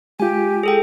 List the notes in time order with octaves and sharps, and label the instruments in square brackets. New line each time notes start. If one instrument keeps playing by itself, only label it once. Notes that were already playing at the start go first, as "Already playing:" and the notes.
[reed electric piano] G#3 F4 [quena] G4 [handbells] G#5
[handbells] G#4 A4 G5